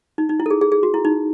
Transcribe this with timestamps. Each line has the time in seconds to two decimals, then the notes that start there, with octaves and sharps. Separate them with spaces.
0.18 D#4
0.29 D#4
0.40 E4
0.46 A4
0.50 G#4
0.61 G#4
0.72 G#4
0.83 F#4
0.94 E4
1.05 D#4